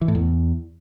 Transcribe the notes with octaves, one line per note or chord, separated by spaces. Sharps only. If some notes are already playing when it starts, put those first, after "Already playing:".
E3
A2
E2